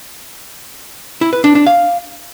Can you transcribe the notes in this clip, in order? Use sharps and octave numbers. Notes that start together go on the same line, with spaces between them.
E4
B4
D4
D4
F5